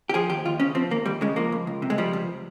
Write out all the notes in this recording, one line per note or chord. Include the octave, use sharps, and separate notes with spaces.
G4
F3 G#4
D#2 G4
D#2 F4
C#3 C#4
F3 C4
D#2 A#3
D#2 G3
C#3 G#3
F3 A#3
C#2
C#2
C3
G#3
F3 G3
C#2